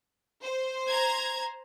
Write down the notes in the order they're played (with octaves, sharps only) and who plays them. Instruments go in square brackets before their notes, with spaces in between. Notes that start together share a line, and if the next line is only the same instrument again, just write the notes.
[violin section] C5
[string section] A#5 G#6